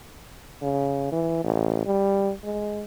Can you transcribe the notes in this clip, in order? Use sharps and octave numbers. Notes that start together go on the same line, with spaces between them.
C#3
E3
A1
G3
G#3